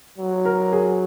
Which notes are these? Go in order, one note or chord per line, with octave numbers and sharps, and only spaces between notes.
F#3
A#4
G#4